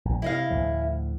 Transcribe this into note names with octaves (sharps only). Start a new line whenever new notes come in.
A#1
C3 E4 D#5 F5
D2 A2 F3